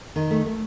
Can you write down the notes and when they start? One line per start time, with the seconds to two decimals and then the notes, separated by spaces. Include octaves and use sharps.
0.16 D#3
0.31 A3
0.46 A3